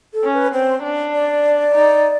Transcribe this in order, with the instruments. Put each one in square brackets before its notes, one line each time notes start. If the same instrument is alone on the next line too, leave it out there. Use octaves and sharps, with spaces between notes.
[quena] A4
[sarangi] C#4
[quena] B4
[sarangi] C4 [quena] C5
[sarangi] D4
[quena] D5
[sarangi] D#4